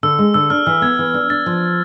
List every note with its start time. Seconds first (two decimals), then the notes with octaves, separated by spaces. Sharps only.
0.03 D3 E6
0.19 G#3
0.34 D3 E6
0.50 D4 F6
0.66 E3 F6
0.82 B3 G#6
0.99 E3
1.14 D4
1.30 D4 A6
1.46 F3